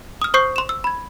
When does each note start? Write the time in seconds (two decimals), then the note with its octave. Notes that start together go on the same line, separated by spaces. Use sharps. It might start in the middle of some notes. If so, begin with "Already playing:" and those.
0.22 D#6 F6
0.34 C5 C#6 D#6 G6 C7
0.56 C6 E7
0.69 E6
0.84 B5 G#6